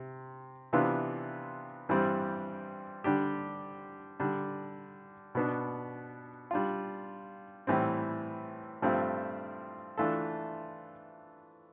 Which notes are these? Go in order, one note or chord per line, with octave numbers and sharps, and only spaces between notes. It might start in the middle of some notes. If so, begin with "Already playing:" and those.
Already playing: C3
C3 E3 B3 D4 F4
G2 E3 G3 C4
D3 G3 D4 G4
D3 G3 D4
B2 B3 D4
G3 D4 F4
A2 E3 G3 C4
G2 F3 A3 C4
E3 A3 D4 F4 A4